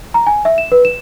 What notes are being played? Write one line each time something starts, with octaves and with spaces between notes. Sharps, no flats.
A#5
G#5
E5
E7
B4
E7